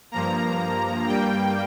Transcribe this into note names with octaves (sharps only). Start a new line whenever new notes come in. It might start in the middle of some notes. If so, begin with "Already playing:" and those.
G2 F3 A#3 A#5
G2 G3 A#3 G5